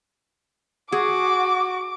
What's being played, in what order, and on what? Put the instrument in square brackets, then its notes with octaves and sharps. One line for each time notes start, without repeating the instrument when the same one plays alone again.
[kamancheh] F#4 [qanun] G#4 [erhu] D6